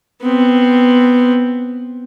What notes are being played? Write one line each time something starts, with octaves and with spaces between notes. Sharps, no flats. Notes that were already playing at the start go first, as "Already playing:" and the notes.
B3 C4